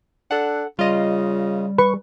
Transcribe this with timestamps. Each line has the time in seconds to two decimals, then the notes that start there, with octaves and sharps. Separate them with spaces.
0.31 D4 A4 F#5
0.79 C#3 G3 F4 D#5
1.78 B4 C#6